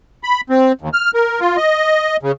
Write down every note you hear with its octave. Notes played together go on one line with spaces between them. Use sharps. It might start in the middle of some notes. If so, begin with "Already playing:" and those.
B5
C4
D#2
F6
A#4
F4
D#5
C#3